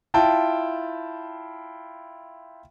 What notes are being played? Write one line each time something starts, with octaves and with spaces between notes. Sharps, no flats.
E4 F4 G5 A5